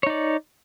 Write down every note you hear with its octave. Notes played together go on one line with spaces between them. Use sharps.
D#4 C#5 D5